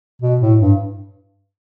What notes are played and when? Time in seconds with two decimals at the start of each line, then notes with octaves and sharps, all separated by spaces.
0.22 B2
0.41 A2
0.60 G2